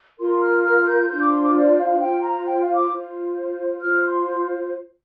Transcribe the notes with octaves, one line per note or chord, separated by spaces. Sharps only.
F4 A#4 C6
F6
F6
G6
D4 F4 C5 G6
D6
C6
D6
D5
F5
F4 C5 G5
A#5
G5
F5
D6
F4 C5
F4 C5 F6
C6
C6